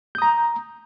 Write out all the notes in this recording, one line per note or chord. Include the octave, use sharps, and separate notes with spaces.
A#5 D#6 G6